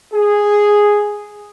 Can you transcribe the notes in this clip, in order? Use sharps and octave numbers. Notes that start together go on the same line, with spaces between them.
G#4